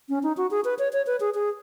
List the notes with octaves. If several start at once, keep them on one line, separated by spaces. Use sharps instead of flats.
C#4
D#4
F#4
G#4
B4
C#5
C#5
B4
G#4
G#4